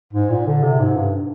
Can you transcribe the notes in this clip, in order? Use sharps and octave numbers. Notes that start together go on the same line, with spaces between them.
G#2
A#2
D3
C3
G#2
G2